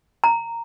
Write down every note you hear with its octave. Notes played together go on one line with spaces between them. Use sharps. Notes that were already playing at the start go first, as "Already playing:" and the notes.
A#5